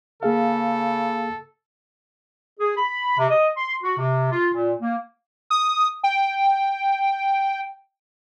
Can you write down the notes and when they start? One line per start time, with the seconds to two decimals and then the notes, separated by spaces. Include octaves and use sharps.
0.23 C#3 A#3 G#4 A4 F5
2.59 G#4
2.77 B5
3.18 C3
3.29 D#5
3.56 C6
3.82 F#4
3.98 C3
4.30 F4
4.53 A#2
4.81 A#3
5.50 D#6
6.03 G5